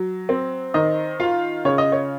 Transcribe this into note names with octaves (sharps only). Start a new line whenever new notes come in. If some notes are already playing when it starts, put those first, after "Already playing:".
Already playing: F#3
C4
D#3 D#5
F4 F5
C#3 C#5
D#5
C#5